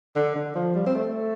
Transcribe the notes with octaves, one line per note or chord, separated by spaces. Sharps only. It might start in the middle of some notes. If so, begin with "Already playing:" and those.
D3
D3
F3
G3
C4
A3